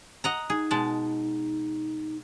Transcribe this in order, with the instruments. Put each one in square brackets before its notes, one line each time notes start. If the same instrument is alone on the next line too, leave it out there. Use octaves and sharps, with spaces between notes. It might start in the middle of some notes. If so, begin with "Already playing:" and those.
[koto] D#5 F#5 A#5
[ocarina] D#4 [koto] G#4
[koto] B2 G#3 A5